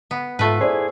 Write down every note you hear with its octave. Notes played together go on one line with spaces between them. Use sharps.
B3
G#2 A3 F4 B4
E4 G#4 C5 D5